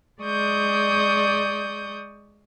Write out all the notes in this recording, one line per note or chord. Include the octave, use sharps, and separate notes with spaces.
G#3 D5 C#6 D#6 G6